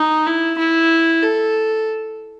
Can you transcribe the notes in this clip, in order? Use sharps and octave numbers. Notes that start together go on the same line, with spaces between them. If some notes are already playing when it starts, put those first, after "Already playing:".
Already playing: D#4
E4
E4
A4